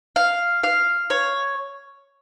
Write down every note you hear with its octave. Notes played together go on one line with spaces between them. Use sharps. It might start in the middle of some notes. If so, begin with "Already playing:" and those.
F5
F5
C#5